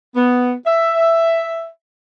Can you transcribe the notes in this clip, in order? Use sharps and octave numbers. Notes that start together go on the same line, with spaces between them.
B3
E5